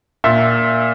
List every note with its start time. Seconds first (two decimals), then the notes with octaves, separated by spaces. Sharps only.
0.24 A#2 E5